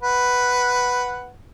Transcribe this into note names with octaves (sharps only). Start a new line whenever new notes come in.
B4 F#5